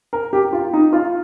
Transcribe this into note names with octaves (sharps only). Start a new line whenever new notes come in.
A#4
G4
F4
D#4
F4